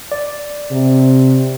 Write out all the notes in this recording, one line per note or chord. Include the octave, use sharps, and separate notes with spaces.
D5
C3